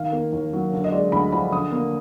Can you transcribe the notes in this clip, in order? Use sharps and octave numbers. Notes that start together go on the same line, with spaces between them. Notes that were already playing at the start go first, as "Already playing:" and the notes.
Already playing: D#3 F5
A#3
D#2
F#3
D3
D#5
G#3 D5
D2 B5
F3 B5
D3 D#6
A#3